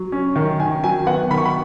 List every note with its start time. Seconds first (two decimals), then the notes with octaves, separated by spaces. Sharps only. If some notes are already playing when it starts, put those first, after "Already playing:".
Already playing: F#3
0.12 C#4
0.36 D#3
0.60 D#3 G#5
0.84 F#3 G#5
1.07 B3 F#5
1.31 D#3 B5
1.38 C#6
1.45 B5